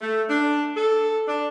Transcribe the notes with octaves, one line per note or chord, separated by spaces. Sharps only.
A3
D4
A4
D4